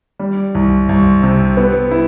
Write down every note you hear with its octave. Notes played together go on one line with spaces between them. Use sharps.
G3
C2
C2
C3
B3
E4